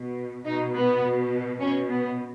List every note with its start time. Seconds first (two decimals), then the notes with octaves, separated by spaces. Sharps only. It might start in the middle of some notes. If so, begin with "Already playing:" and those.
Already playing: B2
0.45 B2 D#4
0.74 B3
1.03 B2
1.60 B2 C#4
1.89 B3